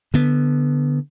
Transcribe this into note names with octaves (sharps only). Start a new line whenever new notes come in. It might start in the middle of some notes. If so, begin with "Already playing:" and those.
D3 B3